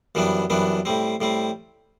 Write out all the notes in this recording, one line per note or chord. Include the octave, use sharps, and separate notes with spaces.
F#2 E3 G3 B3 D4
F#2 E3 G3 B3 D4
A2 G3 C4
A2 G3 C4